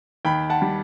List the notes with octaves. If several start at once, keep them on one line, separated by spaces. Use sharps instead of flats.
D#2 G5 B5
F#5 A5
G3